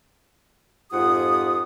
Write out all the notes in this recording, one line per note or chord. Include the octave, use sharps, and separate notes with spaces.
F2 G#2 F4 G4 F#5 D#6